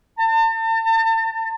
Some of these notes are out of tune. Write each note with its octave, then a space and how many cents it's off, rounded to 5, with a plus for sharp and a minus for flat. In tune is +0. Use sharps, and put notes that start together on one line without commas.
A5 +40